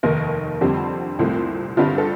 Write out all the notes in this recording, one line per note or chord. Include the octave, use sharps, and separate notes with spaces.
F1 D#2 D#3 A#3 A#4
F2 D3 G3 C4 G4
C2 A#2 A3 C4
G1 G2 D3 G3 C4 F4
A4